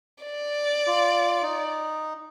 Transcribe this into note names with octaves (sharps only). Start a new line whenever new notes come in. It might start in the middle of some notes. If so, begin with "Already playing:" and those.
D5
F4 D6
D#4